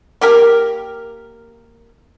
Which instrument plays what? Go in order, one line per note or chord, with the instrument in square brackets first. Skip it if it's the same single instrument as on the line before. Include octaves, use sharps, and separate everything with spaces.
[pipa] A#3 G4 A#4